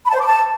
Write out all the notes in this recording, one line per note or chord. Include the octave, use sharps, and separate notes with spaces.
B5
A5
C5
D6
A5